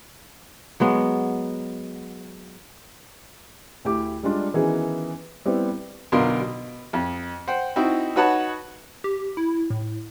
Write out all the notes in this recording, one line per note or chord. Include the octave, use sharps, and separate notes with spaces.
F#3 G#3 B3
D2 E4 G4 D6
G3 G#3 D4 F4
D#3 E3 B3 C#4 F#4 G#4
G3 B3 C4 E4 E5
B1 B2 D3 F4 A#4 C6
B2
F2
C5 F#5 G5
C4 D#4 E4 F#4
D#4 F#4 B4 C#5 F#5 A5
G4
E4
A2